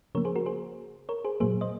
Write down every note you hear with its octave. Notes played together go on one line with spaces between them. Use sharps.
C#3 F3 A#3 A#4 C#5
G#4 C5
F#4 A#4
G#4 C5
A#4 C#5
G#4 C5
A#2 F#3 A#3 G#4 C5
C5 D#5